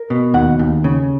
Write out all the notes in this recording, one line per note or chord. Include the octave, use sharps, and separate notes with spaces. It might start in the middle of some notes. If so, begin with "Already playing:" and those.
Already playing: A#4
B2
D#2 F#5
D#2
C#3